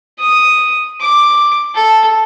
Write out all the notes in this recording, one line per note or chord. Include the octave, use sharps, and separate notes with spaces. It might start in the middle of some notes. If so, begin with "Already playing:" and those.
D#6
D6
A4